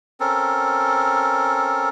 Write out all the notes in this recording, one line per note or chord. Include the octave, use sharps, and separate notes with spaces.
C4 C#4 A4 A#4